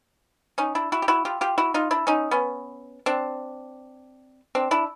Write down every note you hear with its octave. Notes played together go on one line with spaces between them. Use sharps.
C#4 D#4
D4 E4
E4 F#4
G4
E4 F#4
F4 G4
F4 G4
E4 F#4
D#4 F4
D4 E4
C#4 D#4
B3 C#4
C4 D4
C4 D4
D4 E4